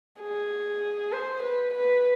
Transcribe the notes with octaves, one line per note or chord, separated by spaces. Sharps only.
G#4
C5
B4
B4